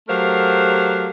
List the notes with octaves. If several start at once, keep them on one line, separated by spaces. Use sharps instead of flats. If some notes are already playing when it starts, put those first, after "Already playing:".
F#3 A3 G4 A#4 C5 F5